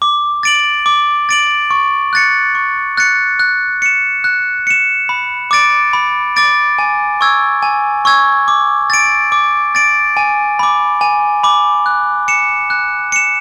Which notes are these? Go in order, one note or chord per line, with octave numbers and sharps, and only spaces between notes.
D6
A6 D7 F#7
D6
A6 D7 F#7
C#6
F#6 A6 C#7
C#6
F#6 A6 C#7
F#6
C#7 E7
F#6
C#7 E7
B5
D6 A6 D7
B5
D6 A6 D7
G#5
C#6 E6 G#6
G#5
C#6 E6 G#6
D6
A6 D7
D6
A6 D7
G#5
B5 D6
G#5
B5 D6
F#6
C#7 E7
F#6
C#7 E7